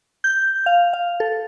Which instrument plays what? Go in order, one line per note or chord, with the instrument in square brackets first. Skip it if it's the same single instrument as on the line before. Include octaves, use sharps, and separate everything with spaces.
[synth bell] G6
F5
F5
A4